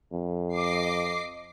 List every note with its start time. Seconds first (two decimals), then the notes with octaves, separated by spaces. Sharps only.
0.13 F2
0.55 D#5 D6 C7